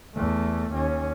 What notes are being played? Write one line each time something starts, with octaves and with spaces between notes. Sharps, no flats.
E2 A3
D#2 C#4